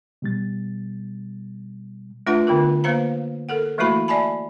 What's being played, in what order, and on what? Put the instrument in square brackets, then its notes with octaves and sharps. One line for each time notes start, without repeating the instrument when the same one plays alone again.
[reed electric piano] B2 G3 A6
[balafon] A3 D4 F4 B4 F#5 C6
D3 B3 F4 A#4
A#3 B4 C5 F5 A#5
A4 A#4 F#5
E3 A3 A#3 E4 F#4 B5
D5 E5 G#5 A5 B5